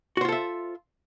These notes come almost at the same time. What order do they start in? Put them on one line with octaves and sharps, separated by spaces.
F#4 C5 F4 A4 E5